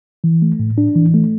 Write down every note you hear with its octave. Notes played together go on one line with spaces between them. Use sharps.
E3
A3
A2
D4
E3
A3